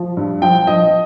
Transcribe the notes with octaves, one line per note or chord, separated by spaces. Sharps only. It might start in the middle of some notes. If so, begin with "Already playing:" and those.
Already playing: F3
G2
F3 G5
F3 D#5